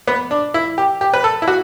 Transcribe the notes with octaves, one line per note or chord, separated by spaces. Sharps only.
B3
D4
E4
G4
G4
B4
A4
E4
F#4